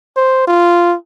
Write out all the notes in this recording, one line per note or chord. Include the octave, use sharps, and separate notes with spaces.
C5
F4